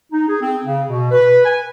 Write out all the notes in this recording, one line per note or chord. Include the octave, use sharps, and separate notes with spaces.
D#4
G#4
C4
C#3
B2
B4
G#5